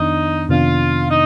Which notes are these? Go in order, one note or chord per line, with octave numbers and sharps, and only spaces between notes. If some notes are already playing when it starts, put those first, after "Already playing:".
Already playing: F2 D#3 B3 D4 D#4
F2 C3 D#3 B3 D4 F4
D#4